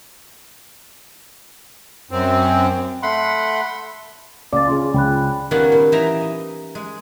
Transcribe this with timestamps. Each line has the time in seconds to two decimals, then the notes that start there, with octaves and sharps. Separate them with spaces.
2.11 F#2 C4
3.03 A3 F#5 B5 C6
4.53 C#2 D5 D6 A6
4.68 C#3 F4 G#4 C6
4.94 C#2 G5 B5 F#6
5.51 D#3 G3 A#3 B3 C#4 F#5
5.72 A#2
5.92 E3 D#4 E5 G5 A#5
6.21 D#5
6.75 G#3